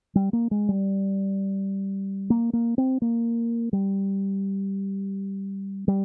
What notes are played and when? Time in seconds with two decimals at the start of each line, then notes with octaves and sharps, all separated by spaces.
0.15 G3
0.33 A#3
0.51 G#3
0.69 G3
2.30 A#3
2.53 A#3
2.78 C4
3.02 A#3
3.73 G3
5.88 G3